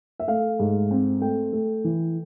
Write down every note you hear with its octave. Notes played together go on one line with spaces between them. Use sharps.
E5
A3 F5
G#2
C4
A3 G5
A3
E3